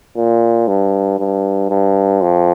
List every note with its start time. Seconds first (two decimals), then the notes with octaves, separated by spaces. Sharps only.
0.17 A#2
0.68 G2
1.19 G2
1.70 G2
2.22 F2